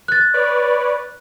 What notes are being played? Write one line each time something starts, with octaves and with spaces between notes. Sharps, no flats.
F#6 A6
B4 C#5 D5